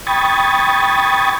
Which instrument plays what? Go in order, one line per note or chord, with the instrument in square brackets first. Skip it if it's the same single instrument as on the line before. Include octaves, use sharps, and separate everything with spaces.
[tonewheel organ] G5 B5 C#6 D#6 G#6 A6